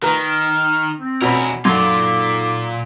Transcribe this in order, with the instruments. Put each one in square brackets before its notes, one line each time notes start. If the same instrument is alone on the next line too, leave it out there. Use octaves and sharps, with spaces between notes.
[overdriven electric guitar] D#3 [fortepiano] A#4 B4 A#5
[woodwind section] F6
C4
[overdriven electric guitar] E2 A#4 [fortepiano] B2 C#4 B5
[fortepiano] F#2 [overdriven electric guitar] A#2 F4 [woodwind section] D#4 A4 D6